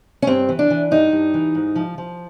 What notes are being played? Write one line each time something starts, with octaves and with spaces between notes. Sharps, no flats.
C#4
G2 C4
E3
D4
E3
G2 D#4
G2
E3
G#2
F3
F3